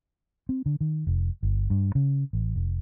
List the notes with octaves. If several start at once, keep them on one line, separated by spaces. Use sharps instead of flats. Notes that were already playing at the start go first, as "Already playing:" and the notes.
C4
D3
D#3
F1
G1
G2
C#3
A1
F1